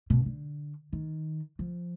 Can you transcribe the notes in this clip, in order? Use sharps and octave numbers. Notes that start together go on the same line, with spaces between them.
B2
D3
D#3
F3